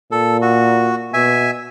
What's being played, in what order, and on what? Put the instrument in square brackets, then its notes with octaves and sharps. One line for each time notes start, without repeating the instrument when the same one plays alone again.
[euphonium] A#2 [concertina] A4
[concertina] F#4
[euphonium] B2 [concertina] E5 G#5